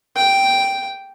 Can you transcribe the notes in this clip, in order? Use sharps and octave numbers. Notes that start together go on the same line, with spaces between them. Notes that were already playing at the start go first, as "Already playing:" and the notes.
G5